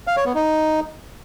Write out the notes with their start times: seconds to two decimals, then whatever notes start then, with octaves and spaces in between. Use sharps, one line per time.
0.07 F5
0.17 C#5
0.26 B3
0.35 D#4